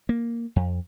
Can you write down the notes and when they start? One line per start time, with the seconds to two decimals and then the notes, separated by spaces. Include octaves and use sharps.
0.09 A#3
0.56 F2